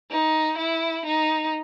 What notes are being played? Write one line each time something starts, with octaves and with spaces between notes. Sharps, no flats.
D#4
E4
D#4